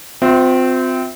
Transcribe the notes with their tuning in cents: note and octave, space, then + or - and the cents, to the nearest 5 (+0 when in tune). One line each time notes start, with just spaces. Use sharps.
C4 -20 F4 +35 E5 +0